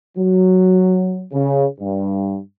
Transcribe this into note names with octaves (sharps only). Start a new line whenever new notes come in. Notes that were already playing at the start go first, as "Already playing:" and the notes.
F#3
C#3
G2